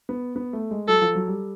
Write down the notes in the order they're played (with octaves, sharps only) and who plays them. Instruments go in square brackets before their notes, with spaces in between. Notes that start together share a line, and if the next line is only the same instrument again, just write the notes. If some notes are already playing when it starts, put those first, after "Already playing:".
[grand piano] B3
B3
A3
G#3
[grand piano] F#3 [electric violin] A4
[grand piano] F3
F#3
G3